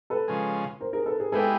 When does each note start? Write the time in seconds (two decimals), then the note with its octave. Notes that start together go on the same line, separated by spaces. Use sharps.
0.10 A4 B4
0.28 C#3 F3 G#3
0.80 A#4 C5
0.93 G#4 A#4
1.06 A4 B4
1.20 G#4 A#4
1.32 G#3 B3 E4 G4 A4 B4